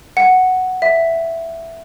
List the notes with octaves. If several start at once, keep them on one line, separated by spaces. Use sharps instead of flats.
F#5
E5